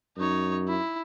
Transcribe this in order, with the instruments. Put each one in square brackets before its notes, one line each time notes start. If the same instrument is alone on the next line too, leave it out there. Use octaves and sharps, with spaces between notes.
[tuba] F#2 [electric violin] D#4 C#5
[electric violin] E4